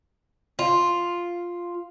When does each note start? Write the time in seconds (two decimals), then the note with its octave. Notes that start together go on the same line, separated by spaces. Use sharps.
0.59 F4